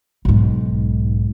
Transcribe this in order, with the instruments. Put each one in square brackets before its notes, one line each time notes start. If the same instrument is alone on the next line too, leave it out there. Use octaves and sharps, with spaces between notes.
[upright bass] B1 G#2